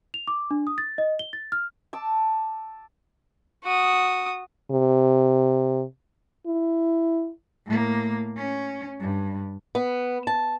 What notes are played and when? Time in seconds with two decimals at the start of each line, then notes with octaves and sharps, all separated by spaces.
0.14 F7
0.28 D6
0.51 D4
0.67 D#6
0.78 A6
0.98 D#5
1.19 G7
1.33 A6
1.52 F6
1.93 A5 D6 E6
3.64 F#4 D#6
4.71 C3
6.46 E4
7.66 A2 A#3
8.37 C#4
9.01 G2
9.75 B3
10.27 A5